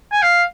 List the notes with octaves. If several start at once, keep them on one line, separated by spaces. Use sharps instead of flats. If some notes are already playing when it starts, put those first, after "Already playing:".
G#5
F5